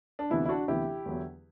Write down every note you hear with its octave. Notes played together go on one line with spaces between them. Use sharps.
D4
D2 C3 E3 B3 E4
E4
D4 F#4
D2 C3 E3 B3 E4 G4
E2 D3 F#3 B3